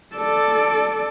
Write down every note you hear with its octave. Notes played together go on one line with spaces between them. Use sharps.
A4 D5